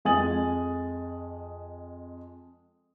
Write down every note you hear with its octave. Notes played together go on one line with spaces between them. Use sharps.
F2 G#3 G#5 D#6 A6 F#7